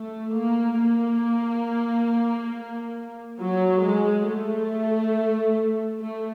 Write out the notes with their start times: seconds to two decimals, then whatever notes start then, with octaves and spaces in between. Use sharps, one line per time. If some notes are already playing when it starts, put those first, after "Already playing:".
Already playing: A3
0.35 A#3
0.78 A#3
3.40 F#3
3.84 G#3
4.27 A3
6.01 A3